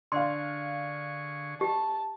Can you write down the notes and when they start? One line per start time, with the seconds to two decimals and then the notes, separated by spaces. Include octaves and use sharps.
0.12 D3 D4 G#4 D5 F5 C6 C#6
1.61 G4 A5